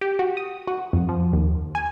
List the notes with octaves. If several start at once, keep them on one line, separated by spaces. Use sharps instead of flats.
G4
F#4
D#6
F#4
F2
F3
D#2
G#5